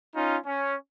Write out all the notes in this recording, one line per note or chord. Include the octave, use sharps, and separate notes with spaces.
C#4 D#4 F4
C#4